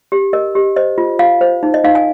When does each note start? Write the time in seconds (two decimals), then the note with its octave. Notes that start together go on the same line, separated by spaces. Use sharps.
0.12 G4
0.33 A#4 D#5
0.55 G4
0.76 C5 D#5
0.98 F4
1.19 F4 F5
1.41 C5
1.63 D#4
1.74 D#5
1.84 D#4 F5
1.95 G#5